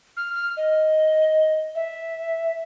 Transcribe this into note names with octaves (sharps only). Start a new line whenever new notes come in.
F6
F6
D#5
E5